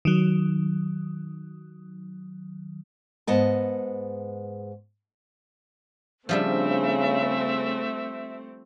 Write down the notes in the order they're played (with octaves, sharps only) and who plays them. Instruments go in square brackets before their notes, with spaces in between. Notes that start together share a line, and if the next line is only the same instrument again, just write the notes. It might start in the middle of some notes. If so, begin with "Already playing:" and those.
[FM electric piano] D#3 F#3
[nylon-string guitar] G#2 B3 D#5 A5
[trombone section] C#3 [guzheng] F3 G3 D4 [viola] A3 C4 [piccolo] E5